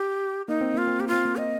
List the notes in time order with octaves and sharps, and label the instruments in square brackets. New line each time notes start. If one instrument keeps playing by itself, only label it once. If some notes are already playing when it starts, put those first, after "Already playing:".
Already playing: [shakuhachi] G4
[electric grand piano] A#3 [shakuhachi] D#4
[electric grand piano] C4
[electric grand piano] A#3 [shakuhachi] F4
[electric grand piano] C4
[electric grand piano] A#3 [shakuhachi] G4
[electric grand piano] C4 [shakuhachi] F4
[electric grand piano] A#3
[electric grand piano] C4 [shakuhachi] D#5